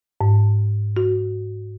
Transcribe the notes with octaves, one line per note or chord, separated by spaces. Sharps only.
G#2
F#4